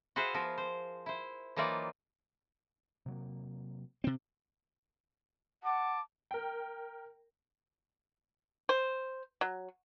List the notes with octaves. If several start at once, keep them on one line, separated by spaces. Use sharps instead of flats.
F#4 G#4 B4 C5 E5 F5
F3 B3 A#4
C5
E4 C5
E3 F#3 A#3 D#4 F4 D5
C3 F#3 A#3
C3 C4
F#5 A5 D6
A#4 G5
C5
F#3